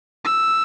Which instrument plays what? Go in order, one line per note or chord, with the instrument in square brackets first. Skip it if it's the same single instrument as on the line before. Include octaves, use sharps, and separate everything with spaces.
[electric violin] E6